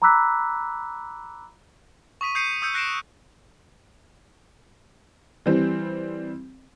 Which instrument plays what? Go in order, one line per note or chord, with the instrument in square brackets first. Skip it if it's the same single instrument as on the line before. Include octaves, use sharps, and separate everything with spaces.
[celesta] A#5 B5 D6 E6 F#6 B6
[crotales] C#6 D#6 B6 D#7
D#6 G6 C7 C#7 D#7
D#6 E6 G6 C#7
F#6 A#6 C7 D7 E7
[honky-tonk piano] E3 G3 C4